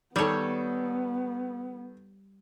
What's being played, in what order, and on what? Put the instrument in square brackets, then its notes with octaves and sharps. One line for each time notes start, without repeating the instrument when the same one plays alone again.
[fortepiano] D#3 A4 [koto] G3 C#5 [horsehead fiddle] B3